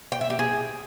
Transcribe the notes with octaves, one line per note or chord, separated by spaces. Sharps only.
G5
E5
G4
G#4